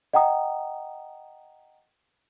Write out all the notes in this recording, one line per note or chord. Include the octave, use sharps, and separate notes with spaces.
D#5 F#5 G5 A#5 D#6